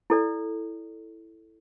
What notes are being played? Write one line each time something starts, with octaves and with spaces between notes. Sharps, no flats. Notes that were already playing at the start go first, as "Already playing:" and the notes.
E4 A4 D5